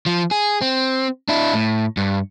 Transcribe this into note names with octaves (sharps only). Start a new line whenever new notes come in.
F3
G#4
C4
D4 E4
A2
G2